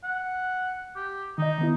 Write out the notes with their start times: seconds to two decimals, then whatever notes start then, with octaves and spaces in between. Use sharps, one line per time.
0.04 F#5
0.96 G4
1.38 D#3 D#4 D#5
1.59 D#3 B3 E4